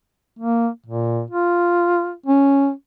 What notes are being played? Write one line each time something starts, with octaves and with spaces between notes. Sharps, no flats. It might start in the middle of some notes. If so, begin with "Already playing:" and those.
A#3
A#2
F4
C#4